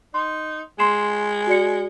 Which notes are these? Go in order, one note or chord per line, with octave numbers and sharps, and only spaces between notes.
D#4 C6
G#3 C6 C7 E7
F#4 D5 C#7